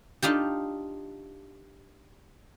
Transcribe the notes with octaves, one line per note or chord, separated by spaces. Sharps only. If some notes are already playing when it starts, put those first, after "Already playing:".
D4 D#4 F4 G4